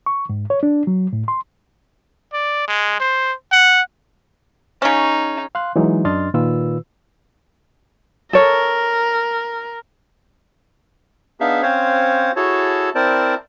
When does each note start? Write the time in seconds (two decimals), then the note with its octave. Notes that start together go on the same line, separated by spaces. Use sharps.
0.06 C#6
0.30 G#2
0.50 C#5
0.63 D4
0.87 F#3
1.13 A2
1.28 C6
2.33 D5
2.68 G#3
3.00 C5
3.52 F#5
4.82 C#3 C#4 D#4
5.55 F5 C6 F#6
5.76 E3 F#3 G#3 D#4
6.05 F#2 D4 D#5 C6 F6 A6
6.34 A#2 D#3 F4 B4 E6
8.33 A4 A#4 C#5
11.40 B3 D4 D#4 G#4 E5 F5
11.62 C4 C#4 C5 C#5 F5
12.36 E4 F#4 G#4 A4 C#5 A5
12.95 C4 E4 A#4 C5 D5 A5